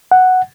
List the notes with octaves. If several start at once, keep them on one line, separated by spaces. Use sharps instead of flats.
F#5